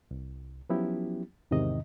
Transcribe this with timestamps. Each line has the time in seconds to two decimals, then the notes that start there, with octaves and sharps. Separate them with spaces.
0.11 C2
0.69 F3 F#3 B3 C#4 E4 G4
1.51 E2 G#2 C3 D#3 D#5